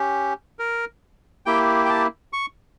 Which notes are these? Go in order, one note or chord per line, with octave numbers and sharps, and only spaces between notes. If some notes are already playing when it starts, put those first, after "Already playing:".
Already playing: C#4 G4
A#4
A#3 E4 G4 G5
G5
A5
C#6